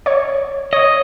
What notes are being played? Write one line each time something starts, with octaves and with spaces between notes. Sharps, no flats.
C#5 D5
C#5 D#5